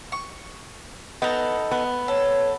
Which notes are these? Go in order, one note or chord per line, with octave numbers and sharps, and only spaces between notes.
C#6
B3 D#4 A4 A#5
B3
A4 C#5